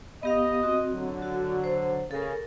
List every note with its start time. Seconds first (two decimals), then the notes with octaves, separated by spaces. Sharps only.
0.23 B3 G4 D#5 F5
0.63 C4 F#4
0.93 D3 F#3
1.22 F#4
1.64 C5
2.11 C#3 A4 A#4